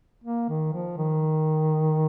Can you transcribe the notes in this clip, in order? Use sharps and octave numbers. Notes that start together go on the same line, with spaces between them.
A#3
D#3
F3
D#3